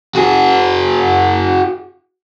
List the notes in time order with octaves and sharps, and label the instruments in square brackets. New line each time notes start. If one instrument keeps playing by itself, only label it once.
[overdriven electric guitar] F#4 G#4